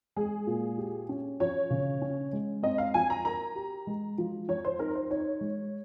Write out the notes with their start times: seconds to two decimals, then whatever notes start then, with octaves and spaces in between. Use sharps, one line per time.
0.16 G#3 G#4
0.47 A#2
0.78 G4
1.09 C#4
1.40 F3 C#5
1.70 C#3
2.02 C#4
2.33 G#3
2.63 C4 D#5
2.78 F5
2.94 F3 G#5
3.10 A#5
3.25 A#4 A#5
3.55 G4
3.87 G#3
4.18 F3
4.48 F3 C#5
4.65 C5
4.79 D#4 A#4
4.95 C5
5.10 D#4 C#5
5.41 G#3